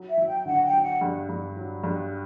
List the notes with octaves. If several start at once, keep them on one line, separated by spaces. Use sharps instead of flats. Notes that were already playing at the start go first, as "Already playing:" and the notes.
Already playing: F#3
E5
F#3
G5
D3 F#5
G5
F#3
F#5
G2
G2
F#3
G2